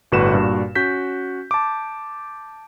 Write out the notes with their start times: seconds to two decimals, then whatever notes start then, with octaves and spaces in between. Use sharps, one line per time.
0.12 G1 A2 F#4 B4 D5 E7
0.34 G2 A#2 F#4
0.75 C#4 F#4 G6 B6
1.51 A5 D6